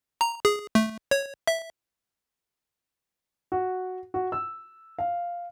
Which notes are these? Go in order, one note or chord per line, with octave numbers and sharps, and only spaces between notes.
A#5
G#4
A3
C#5
E5
F#4
F#4
E6
F5